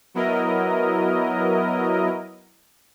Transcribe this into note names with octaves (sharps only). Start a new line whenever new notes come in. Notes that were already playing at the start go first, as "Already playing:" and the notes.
F#3 B3 E4 A#4 D#5